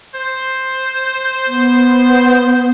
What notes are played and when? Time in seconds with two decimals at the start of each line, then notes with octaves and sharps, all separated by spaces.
0.15 C5
1.47 B3